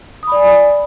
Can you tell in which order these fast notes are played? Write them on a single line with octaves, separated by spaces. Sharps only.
D#6 B5 D5 G#5